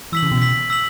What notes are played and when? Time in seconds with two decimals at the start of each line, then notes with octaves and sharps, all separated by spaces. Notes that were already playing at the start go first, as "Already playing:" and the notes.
0.12 E3 E6 B6 F#7
0.23 C#3
0.31 B2
0.41 E6 B6 F#7
0.70 E6 B6 F#7